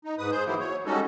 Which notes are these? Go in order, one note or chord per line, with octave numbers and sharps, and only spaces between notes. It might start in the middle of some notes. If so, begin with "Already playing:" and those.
D#4
G#2 B4 D#6
G#4 C5 G6
E3 F#3 A#3 E4
C#5
G3 G#3 C#4 D#4 F#4 A4